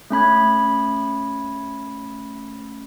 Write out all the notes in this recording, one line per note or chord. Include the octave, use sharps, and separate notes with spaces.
A3 C#4 B5 G#6